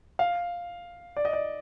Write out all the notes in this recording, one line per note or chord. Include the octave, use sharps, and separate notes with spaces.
F5
D5
D#5
D5